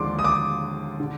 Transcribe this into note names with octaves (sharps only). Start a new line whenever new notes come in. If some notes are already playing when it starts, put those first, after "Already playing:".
Already playing: D#2 D3 F3 G#3 D4 C6 D6
D#6
D6
D3